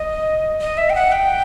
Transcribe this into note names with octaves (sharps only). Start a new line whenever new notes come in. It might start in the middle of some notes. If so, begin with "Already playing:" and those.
Already playing: D#5
D#5
E5
G5
F#5
G5